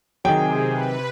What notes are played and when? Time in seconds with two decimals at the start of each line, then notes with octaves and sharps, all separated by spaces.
0.25 C3 D#3 F#3 G#4 G5
0.70 B4